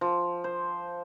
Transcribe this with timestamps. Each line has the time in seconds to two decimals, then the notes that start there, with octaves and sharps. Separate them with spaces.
0.01 F3
0.44 C5